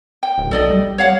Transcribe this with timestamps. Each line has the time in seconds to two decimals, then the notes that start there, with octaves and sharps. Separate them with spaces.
0.23 G5
0.38 D1
0.51 B1 A4 D5 D#5
0.70 G3
0.98 C#5 F5 F#5